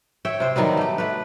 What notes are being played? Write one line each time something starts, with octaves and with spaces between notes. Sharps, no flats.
C#5 E5 G5
C3 C5
D#3 F#3 G3 B3
A3 G4
A3 B4